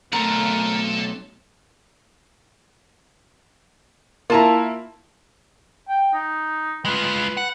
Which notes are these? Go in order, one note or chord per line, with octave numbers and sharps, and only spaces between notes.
B1 A3 C4 A4 A#4 F#5 A#5
A#3 E4 F4 A5 A#5
G5
D#4
G#3 F4 B4
F#5